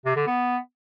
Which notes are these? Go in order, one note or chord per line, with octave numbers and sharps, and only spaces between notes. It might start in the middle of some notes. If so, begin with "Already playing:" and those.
C3
D3
B3